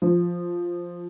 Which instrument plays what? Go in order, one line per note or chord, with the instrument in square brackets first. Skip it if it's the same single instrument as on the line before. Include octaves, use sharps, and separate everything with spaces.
[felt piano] F3